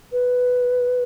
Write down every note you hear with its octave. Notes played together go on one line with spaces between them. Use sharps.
B4